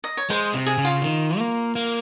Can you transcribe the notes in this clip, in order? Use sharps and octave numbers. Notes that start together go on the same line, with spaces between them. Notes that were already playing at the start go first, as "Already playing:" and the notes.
D#5
C#5
G#3 C5
C3
G#4
C#3
F4
D#3
A#3
A#3